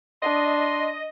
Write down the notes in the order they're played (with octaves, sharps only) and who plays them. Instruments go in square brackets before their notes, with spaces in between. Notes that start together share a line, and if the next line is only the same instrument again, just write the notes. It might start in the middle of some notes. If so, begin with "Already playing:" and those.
[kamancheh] D4 [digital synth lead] D#5 [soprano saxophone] C6